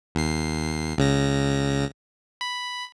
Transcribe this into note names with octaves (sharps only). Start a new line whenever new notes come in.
D#2 C7
C#2 C#3 A#6
B5